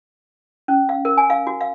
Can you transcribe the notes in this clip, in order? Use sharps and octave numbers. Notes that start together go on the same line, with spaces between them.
C#4
F5
A#4
G#5
F5
F#4
F5